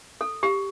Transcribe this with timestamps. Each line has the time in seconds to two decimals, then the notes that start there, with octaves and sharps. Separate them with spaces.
0.21 A4
0.43 G4